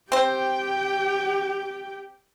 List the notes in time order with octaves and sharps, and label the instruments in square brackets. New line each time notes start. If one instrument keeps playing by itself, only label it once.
[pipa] C4 C5 [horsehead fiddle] G4 G5